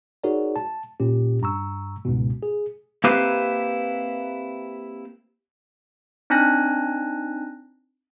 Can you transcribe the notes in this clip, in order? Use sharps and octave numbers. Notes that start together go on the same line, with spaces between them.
D#4 F#4 G#4 A#4 C#5 D5
A5
A#2 C#4 G4
G2 A#5 C#6 E6
C#2 G#2 B2
G#4
A#3 C4 E4 G4 B4 C5
C4 D4 D#4 G#5 F#6 A#6